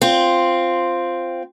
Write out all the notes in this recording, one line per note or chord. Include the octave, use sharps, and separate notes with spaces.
C4 F4